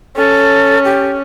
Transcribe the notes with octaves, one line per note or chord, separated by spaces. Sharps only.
C#4 A4
G4